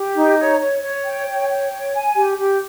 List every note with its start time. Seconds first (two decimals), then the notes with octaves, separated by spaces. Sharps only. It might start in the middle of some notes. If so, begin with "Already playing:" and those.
Already playing: G4
0.16 D#4
0.39 C#5
0.60 C#5
0.83 C#5
1.06 G5
1.28 C#5
1.49 G5
1.73 C#5
1.95 G#5
2.17 G4
2.39 G4